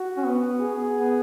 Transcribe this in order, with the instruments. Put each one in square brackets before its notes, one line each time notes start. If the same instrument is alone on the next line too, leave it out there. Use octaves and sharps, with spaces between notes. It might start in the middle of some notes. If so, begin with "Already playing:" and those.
Already playing: [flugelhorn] F#4
[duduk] C#4
B3
[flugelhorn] G#4
[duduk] B3